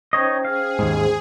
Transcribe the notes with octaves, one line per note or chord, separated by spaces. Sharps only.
C#4 D#4 C5 C#5 D#5 G5
G#4 F5
D#2 G#2